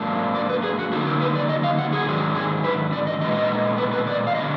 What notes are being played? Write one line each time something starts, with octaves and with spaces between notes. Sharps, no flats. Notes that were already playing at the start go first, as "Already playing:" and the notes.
Already playing: G#2 F#3 A#3 D4
D5
B4
G#4
F#4
D3 F#3 A#3 D#4 G#4
A#4
B4
D5
D#5
F5
F#5
G#4
G#2 D#3 F#3 D4
G#4
B4
D5
D#5
A#2 G#3 B3 D#4 D#5
D#5
B4
B4
D5
F5
D3 F#3 B3 D4 D#5